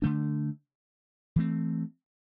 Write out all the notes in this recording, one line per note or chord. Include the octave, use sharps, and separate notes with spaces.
D3 A3 D4
E3 A3 C4